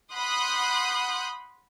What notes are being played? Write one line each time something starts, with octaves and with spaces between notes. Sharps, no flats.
F#5 B5 C6 D#6 F#6 G6